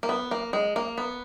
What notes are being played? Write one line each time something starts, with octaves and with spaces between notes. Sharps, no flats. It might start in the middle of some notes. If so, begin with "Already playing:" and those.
A#3
B3
A#3
G#3
A#3
B3